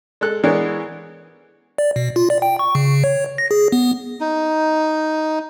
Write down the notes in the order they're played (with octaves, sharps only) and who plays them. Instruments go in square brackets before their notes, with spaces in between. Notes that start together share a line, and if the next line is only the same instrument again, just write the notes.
[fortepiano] G#3 A4 F#6
E3 G#3 B3 D4 A#4 C#5
[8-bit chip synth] D5
B2
F4
D5
G5
C#6
C#3
C#5
A#6
G#4
B3
[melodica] D#4